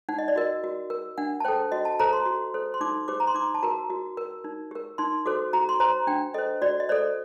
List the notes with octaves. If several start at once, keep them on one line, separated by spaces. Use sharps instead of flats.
D#4 F#5
D#5
D5
F#4 A#4 D#5
F#4
A#4
D4 F#5
A5
A4 C5 G5
F#4 D#5
A5
A4 C5 A#5
C6
F#4
A4 C5
C6
D#4 D6
G4 C5 D6
A#5
C6
D#4 D6
A5
F#4 A#4 A#5
F#4
A#4
D#4
G4 A#4
D#4 C6
F#4 A4 C5 D6
F#4 A#5
C6
C5 A#5
D4 G5
A4 C5 D#5
F#4 D5
D#5
A4 C5 D5